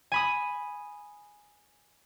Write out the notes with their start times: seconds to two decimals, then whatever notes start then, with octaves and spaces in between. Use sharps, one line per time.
0.12 G#5 B5 D#6